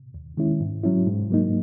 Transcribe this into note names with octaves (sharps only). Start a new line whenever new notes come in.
D#2
D#3 G#3 C#4 E4
G#2
F#3 C#4 E4
G#2
F#3 A#3 D#4